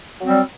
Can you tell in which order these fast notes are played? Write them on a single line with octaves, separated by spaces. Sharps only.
F#3 C4 G3